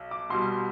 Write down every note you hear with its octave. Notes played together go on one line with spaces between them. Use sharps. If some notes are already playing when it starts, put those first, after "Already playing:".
Already playing: B1
D6
C2 B2 G3 C6